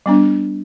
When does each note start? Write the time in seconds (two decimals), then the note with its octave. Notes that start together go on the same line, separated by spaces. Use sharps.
0.06 G3 B3 D4